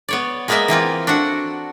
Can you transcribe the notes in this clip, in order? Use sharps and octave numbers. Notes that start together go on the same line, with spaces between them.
B3 C#5 D5
G#3 A#3 B3 A#4 D#5 E5
E3 A#3 C4 F4
D4 F#4 A4 F#5